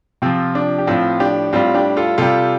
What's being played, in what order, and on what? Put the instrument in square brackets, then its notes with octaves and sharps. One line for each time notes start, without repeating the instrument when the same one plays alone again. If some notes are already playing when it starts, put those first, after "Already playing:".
[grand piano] C3 F3 C4 F4
D4
G4
A2 F3 C4 F4
D4 G4
A2 G3 C4 F4
D4 G4
F4 A4
C3 G3 F4 A4